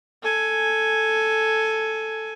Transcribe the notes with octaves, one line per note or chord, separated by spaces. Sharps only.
A4 G#5